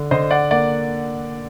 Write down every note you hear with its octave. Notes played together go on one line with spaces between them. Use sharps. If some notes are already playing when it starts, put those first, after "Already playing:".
Already playing: D3
D3 C5 D#5
D5 F#5
A#3 D5 F#5